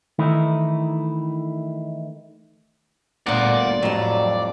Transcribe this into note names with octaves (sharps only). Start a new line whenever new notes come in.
D#3 E3 A3 D#4 E4
G1 D2 A#2 F4 A#4 D5 F#5
F2 A2 F#3 G3